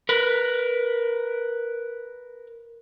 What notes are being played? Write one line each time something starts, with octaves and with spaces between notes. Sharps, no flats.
A#4 B4